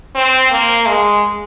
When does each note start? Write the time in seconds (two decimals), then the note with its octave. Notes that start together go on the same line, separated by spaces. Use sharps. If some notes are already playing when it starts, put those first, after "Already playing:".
0.15 C4
0.52 A#3
0.87 G#3